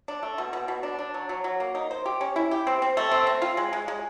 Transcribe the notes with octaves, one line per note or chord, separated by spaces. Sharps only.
D4
A3
B2
B2
B2
D4
D4
F#3
F#3
F#3
A#3
D#4
C5
G4
C#4
E4
G4
C4
C4
A3
C4
C4
F4
G#3
G#3
G#3